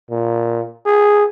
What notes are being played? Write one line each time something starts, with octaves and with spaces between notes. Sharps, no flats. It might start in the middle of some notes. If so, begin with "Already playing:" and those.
A#2
G#4